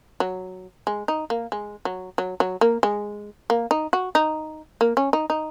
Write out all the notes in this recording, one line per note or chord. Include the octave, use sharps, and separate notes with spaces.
F#3
G#3
D#4
A#3
G#3
F#3
F#3
F#3
A#3
G#3
A#3
D#4
F#4
D#4
A#3
C#4
D#4
D#4